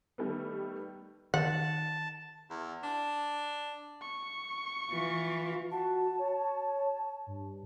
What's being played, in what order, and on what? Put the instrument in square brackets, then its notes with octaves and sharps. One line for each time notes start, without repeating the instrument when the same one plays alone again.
[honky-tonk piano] D#3 G3 A3 B3
[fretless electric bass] D#3 [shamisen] F#5 [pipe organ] A5
[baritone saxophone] E2
D4
[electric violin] C#6
[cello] E3 [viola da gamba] F4
[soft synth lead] F#4 [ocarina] A5
[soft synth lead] C#5
G2